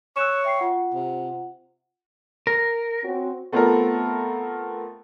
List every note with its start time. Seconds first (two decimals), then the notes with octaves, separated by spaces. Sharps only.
0.17 C#5 E6 F#6 E7
0.44 E5 G5 C7
0.59 F4 F#5
0.94 C3
2.47 A#4
3.04 C4 C#4 F#4
3.52 A3 B3 C4 F4 A4 A#4